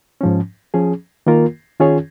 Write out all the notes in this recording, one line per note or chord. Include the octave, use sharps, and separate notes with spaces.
G#2 F3 C#4
F3 C#4 G#4
D#3 A#3 F4 A#4
D#3 C#4 F4 G#4 C#5